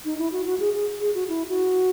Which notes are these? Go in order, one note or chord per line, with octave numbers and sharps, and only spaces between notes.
D#4
E4
F#4
F#4
G#4
G#4
G#4
F#4
E4
F#4